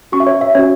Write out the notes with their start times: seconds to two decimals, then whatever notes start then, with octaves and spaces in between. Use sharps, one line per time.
0.12 C#4 F#4 C#6
0.20 E5
0.27 C#5
0.41 E5
0.55 C#4 F#4 C#5